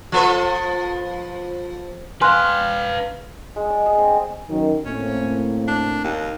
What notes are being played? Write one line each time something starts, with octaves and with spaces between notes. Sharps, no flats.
F3 A4 B4
B4 F5 G#5 C6 F6 F#6
G#3
D5
G#4
C4
F#2 D#3
A2 A#3 C4 C#4
D4
D#2